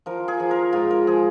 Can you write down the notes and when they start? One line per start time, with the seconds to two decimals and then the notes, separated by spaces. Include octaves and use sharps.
0.06 F3 A#4
0.28 G#4
0.40 F3
0.51 A#4
0.73 G#2 F4
0.91 A#4
1.07 F3 G#4